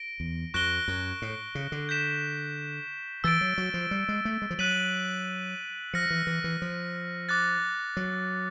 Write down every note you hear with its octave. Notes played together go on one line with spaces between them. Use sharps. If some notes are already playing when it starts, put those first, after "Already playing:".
Already playing: A#6 D7 G7
E2
F2 C#6 F#6 A#6 D7 G7
F#2
A2
C#3
D3
G6 B6 E7
E3 E6 A6 D7
F#3
F#3
F3
G3
G#3
A3
G#3
F3
F#3 F#6 B6 D#7 F#7
F3 F6 A#6 C#7
E3
E3
E3
F3
D6 F#6 A6
F#3